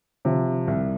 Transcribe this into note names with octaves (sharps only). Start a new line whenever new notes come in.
C3 F3
C2